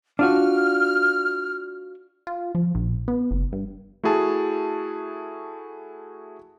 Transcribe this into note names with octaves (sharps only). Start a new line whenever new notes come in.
D4 F4 F#4 F6
F4
F3
A#1
B3
F#1
G2
A3 E4 F#4 G#4 A5